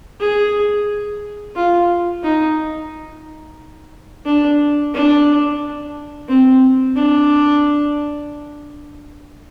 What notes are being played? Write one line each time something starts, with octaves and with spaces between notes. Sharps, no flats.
G#4
F4
D#4
D4
D4
C4
D4